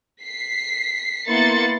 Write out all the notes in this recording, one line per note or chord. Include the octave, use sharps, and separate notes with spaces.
B6 C7
A#3 B3 E4 C6 A6 C#7